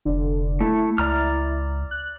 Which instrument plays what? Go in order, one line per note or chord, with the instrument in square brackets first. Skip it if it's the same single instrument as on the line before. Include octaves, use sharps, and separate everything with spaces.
[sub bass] F1 [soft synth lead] D3
[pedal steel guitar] A3 [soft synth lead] E4
[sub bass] C#2 [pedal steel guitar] D5 A#5 F6
[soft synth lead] F#6